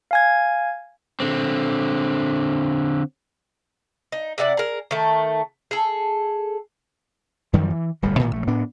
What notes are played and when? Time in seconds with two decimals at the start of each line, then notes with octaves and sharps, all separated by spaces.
0.11 F5 G#5 G#6
1.20 D3 C4
4.12 D#4
4.38 C3 E4 D5 F#5
4.57 G#4 A#4
4.91 D#3 A3
5.71 G#4 A4
7.53 F#2 D#3 F3 G3
7.70 E3
8.02 D1 G1 A#2 G3
8.19 A1 A2 D#3 A3
8.33 A#1 A3
8.47 A2 B3 D4